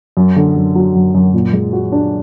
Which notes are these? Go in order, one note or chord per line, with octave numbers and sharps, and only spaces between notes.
F#2
D3
F#2
F#3
F#2
F#2
A#2
G#3
F#4
D4